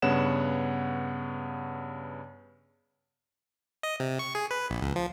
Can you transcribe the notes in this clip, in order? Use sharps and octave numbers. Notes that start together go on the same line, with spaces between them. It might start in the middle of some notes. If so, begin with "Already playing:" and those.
G2 C#3 B3 C#5 F#5 E7
D#5
C3
C#6
G#4
B4
A#1
C#2
F3